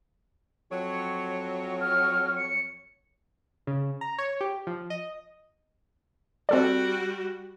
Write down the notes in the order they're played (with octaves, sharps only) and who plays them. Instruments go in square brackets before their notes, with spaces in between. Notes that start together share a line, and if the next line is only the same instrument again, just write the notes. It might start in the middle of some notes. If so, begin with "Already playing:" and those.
[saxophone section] F2 F#3 C#5
[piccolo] F6
C#7
[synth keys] C#3
A#5
C#5
G4
F3
D#5
[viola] G3 F#4 [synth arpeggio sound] C4 A4 D5